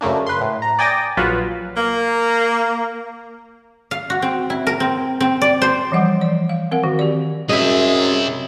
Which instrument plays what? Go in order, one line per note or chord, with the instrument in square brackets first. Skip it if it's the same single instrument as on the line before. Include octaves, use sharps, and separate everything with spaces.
[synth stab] F#2 C#3 A3 A#3 D4
B4 C6
A2
A#5
D5 G5 G#5 D#6 A6 A#6
A#1 F#3 F4 F#4 B4
[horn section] A#3
[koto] F5
F#4
C4
E4
A#4
C4
C4
D5
C5
[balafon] E3 F3 G3 F#5
D5
F5
C4 A#4 F5 F#5
D#3 F#4
G4 D5
[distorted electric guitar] C2 E4 [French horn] F#2 [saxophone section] G#4 [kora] D#5 E5